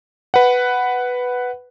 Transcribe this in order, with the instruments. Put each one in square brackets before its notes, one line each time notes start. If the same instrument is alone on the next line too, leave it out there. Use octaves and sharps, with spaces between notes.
[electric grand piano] B4 F#5